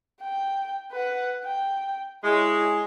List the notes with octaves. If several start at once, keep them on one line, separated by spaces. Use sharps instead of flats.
G5
B4 F#5
G5
G#3 E4 C#5